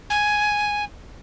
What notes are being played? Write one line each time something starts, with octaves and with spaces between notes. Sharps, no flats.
G#5